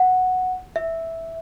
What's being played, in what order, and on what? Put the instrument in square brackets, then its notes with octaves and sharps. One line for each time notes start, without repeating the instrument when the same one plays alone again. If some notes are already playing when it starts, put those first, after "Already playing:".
Already playing: [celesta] F#5
E5